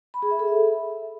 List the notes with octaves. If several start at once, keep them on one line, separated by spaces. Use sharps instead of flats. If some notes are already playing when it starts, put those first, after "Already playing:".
B5
G#4
E5
A4
E5